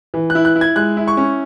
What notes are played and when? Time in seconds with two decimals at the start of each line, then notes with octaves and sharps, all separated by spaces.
0.14 E3
0.30 F#6
0.35 E4
0.45 F#6
0.56 E4
0.61 G#6
0.76 G#3 F#6
0.97 E4
1.08 C#6
1.17 C#4